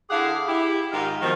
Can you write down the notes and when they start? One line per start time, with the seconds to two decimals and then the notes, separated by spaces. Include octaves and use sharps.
0.10 D3 E4 G4 G#4 F5 F#5
0.47 E4 G4
0.92 G#2 D#3 G#3 F4 G4
1.21 B2 D#3 F3